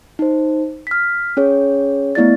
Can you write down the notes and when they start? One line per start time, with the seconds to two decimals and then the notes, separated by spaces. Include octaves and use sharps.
0.19 D#4 C5
0.87 F6 B6
1.37 C#4 G#4 C#5
2.15 A3 B3 E4 D5 A6